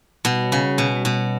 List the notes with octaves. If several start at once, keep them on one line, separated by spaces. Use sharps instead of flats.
B2 G3
C#5
C#3
F#4
B2 B3
G3
B2
C#5